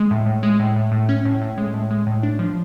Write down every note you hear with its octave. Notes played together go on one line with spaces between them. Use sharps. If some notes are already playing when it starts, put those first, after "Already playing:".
Already playing: G#3
A2
A2
G#3
A2
A2
A2
C#4
A2
A2
G#3
A2
G#3
A2
D4
F3